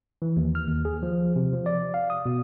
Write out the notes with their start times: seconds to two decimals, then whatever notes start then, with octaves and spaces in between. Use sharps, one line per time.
0.22 E3
0.37 D#2
0.55 F6
0.67 D#2
0.85 G#4
1.03 F3
1.36 C3
1.53 F3
1.66 D5
1.94 F5
2.10 D#6
2.26 B2